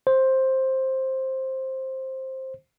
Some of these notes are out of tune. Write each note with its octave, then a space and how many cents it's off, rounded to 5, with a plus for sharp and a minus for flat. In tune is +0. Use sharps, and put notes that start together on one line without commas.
C5 +10